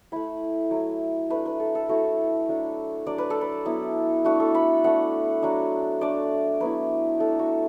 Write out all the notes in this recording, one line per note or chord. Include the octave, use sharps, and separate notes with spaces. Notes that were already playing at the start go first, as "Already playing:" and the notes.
A3 E4 B5
F#3 A3 E4
A3 D4 B4
B4
A4
A4
A3 E4 F#4
F#3 A3 D4
F#3 D4 D5
B4
A4
B4
F#3 B3 E4
A3 D4 F#4
A4
B5
A3 D4 F#5
F#3 D4
A3 D4 D5
F#3 B3 E4 B4
A3 D4 A4
F#4